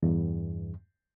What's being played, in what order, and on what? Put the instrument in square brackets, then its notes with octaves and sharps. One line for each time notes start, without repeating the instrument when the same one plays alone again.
[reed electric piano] E2 G2